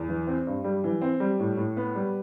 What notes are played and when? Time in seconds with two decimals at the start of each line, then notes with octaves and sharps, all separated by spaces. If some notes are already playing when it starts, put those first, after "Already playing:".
Already playing: E2
0.09 E3
0.27 C4
0.47 G2
0.64 G3
0.84 E3
1.01 C4
1.20 G3
1.40 A2
1.57 A2
1.77 B3
1.95 G3